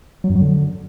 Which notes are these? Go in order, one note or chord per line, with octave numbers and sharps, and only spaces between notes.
F#3
F#2
F#3
D3